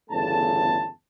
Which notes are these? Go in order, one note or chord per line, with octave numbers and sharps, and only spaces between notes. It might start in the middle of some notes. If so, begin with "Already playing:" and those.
G1 E2 C#3 A3 A5